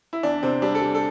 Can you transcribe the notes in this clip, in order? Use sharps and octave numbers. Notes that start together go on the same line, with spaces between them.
E4
E2 D4
C3 C4
G3 D4
A4
G3
A4